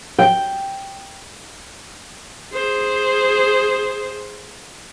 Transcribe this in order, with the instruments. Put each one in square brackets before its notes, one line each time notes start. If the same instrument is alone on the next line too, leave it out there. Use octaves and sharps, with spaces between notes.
[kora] G5
[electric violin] G#4 C5